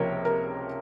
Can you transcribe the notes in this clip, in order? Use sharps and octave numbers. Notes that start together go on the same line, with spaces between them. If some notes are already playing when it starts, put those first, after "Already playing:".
Already playing: C#2 C3 F3 A#3 A#4 C#5
A#4